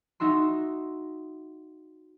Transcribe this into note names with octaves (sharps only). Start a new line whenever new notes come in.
D#4 F#4 E5 C6